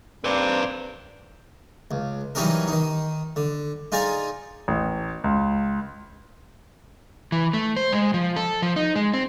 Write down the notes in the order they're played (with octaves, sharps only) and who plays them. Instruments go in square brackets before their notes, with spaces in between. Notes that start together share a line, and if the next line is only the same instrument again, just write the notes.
[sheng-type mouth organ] A#3 D4 D6 [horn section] C4 [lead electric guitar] B4 D5
[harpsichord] C#2
E3 F#3 G3 C#4 D#4 A#4
D#3 D#4
D3
D#4 F4 G#4 D5 G#5 A#5
[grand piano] A1
C#2
[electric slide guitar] E3
A3
C5
G#3
F3
A4
F3
D#4
G#3
C4